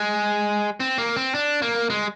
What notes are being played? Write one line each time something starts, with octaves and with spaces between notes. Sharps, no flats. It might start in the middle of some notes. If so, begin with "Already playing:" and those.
Already playing: G#3
C4
A#3
C4
D4
A#3
G#3